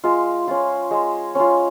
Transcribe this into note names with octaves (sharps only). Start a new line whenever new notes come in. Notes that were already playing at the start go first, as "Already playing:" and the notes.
G#3 F4
C#4 F4
G#3
C#4 F4